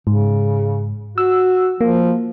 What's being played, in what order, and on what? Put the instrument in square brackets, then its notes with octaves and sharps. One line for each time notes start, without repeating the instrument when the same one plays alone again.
[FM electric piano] G#2 [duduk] C#3
[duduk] F#4 [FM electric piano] E6
[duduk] F3 [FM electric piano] A#3